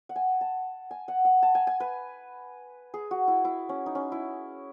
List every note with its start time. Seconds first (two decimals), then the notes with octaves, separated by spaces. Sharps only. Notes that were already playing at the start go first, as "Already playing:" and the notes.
0.09 F#5
0.16 G#5
0.41 A5
0.91 G#5
1.08 F#5
1.25 F#5
1.43 A5
1.55 G#5
1.67 G#5
1.80 B4
2.94 G#4
3.11 F#4
3.28 E4
3.45 E4
3.69 C#4
3.86 D#4
3.95 C#4
4.12 E4